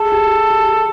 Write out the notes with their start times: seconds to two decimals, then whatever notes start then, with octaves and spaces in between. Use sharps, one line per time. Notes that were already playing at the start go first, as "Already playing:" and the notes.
Already playing: G#4 A4
0.12 G4
0.50 G4